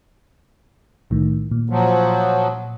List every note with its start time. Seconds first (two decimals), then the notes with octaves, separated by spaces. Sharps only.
1.10 C2 A2 D#3
1.51 A#2
1.70 F3 F#3